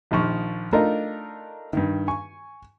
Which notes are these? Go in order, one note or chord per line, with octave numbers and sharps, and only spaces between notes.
A#1 D#3 F3 C#6
A3 D4 D#4 F4 A#4 D#5
G2 D#3
G#5 C#6